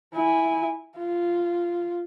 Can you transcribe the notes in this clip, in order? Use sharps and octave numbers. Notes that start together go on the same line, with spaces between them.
E4 G#5
F4